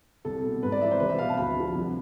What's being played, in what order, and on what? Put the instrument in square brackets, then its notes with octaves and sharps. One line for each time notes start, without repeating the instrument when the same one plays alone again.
[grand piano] C2 A4
B2
G#2 B4
D5
E3 E5
C5
C2 B4
E5
B2 F5
A5
D2 B5
D3 F3
C2